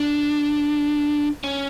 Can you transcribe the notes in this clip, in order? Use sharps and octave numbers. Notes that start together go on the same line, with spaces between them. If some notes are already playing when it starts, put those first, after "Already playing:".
Already playing: D4
C#4